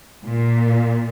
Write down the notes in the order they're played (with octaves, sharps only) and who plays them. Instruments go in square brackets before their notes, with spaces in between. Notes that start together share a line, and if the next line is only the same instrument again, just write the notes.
[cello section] A#2